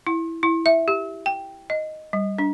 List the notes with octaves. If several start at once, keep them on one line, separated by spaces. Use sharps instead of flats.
E4
E4
E5
G4
G5
D#5
G3
D4